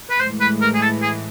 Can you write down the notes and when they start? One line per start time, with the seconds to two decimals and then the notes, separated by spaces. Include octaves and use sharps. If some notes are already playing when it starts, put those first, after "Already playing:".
0.10 B4
0.19 A2 E3 G#3 C5
0.41 B4
0.61 A#4
0.74 G#4
0.82 A4
1.02 G#4